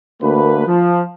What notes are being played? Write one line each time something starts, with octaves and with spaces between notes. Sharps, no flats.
D2 A#3 B4
F3